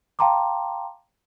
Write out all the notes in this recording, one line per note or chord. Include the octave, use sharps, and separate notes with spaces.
F5 G5 A5 A#5 C6 D6